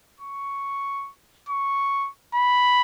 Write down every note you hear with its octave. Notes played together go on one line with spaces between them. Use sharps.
C#6
C#6
B5